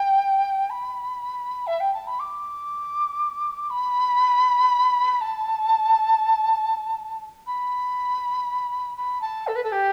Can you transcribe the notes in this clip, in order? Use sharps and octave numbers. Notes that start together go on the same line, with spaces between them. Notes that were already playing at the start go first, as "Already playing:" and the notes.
Already playing: G5
B5
E5
G5
A5
B5
D6
B5
A5
B5
B5
A5
A4
B4
A4
G4